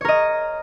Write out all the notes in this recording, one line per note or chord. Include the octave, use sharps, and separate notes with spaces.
A#4 C#5 D#5